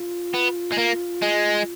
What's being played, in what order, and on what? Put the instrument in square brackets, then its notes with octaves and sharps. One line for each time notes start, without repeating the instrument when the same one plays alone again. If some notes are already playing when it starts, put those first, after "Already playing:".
Already playing: [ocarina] F4
[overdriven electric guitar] B3
G#3
A#3
G#3